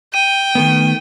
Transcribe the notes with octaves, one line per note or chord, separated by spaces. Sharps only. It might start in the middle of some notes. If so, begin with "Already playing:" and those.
G5 D#7
D#3 A3 B3